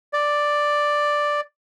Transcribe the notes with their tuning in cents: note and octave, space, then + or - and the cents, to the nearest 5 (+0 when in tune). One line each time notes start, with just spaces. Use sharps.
D5 +5